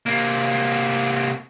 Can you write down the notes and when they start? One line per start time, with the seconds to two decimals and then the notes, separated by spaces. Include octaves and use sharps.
0.06 C3 A#3